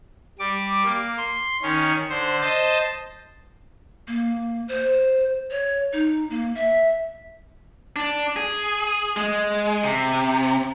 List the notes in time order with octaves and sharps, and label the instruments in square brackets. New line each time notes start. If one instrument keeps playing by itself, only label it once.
[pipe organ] G3 D6
A#3
C6
D#3 C#4
D3 C5
C5 D#5 A5
[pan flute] A#3
C5
C#5
D#4
A#3
E5
[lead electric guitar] D4
G#4
G#3
C3